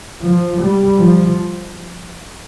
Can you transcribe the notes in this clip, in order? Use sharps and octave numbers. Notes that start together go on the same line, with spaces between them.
F3
G3
F3